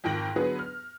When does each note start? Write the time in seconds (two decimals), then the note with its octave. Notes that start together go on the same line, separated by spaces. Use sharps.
0.04 F2 G#2 D#3 G5 A#6 F#7
0.36 D3 F#3 B3 G#4 B4
0.59 F6